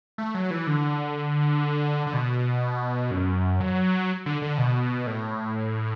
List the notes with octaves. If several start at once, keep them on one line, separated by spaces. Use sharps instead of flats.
A3
F#3
E3
D3
D3
B2
F#2
F#3
D3
D3
B2
A2